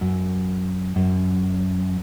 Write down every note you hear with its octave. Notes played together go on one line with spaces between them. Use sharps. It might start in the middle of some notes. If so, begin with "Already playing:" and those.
F#2
F#2